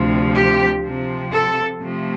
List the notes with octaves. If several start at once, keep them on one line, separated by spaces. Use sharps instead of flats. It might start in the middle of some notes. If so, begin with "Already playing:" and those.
Already playing: D2 C3 F3
G4
C3 F3 C4
A4
C3 F3 A3